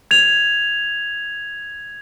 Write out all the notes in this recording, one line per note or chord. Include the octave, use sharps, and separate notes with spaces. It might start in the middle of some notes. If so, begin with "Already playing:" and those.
G#6 F7